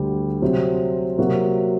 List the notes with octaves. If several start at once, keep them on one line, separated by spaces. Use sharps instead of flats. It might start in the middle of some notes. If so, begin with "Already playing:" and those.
Already playing: D2 D3 G3
C3 F#3 C4
C3 F#3 A#3 F#4 A#4